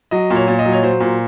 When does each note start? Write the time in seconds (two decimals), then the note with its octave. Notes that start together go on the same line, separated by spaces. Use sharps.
0.11 F#3 D#5
0.30 A#2
0.36 C#5
0.48 A#2
0.59 D#5
0.66 F#3
0.72 C#5
0.83 F#3 C5
1.00 A#2